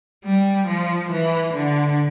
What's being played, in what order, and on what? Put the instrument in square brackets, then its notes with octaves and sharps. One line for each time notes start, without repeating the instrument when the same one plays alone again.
[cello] G3
F3
E3
D3